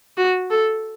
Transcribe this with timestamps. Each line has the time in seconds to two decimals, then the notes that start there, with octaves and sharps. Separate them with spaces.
0.17 F#4
0.50 A4